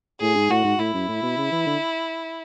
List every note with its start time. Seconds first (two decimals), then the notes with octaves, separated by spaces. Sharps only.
0.21 A2 G#4
0.35 G#2
0.50 A2 F#4
0.64 G#2
0.79 A2 E4
0.94 F#2
1.08 A2
1.23 B2
1.37 C#3
1.51 E3
1.66 D3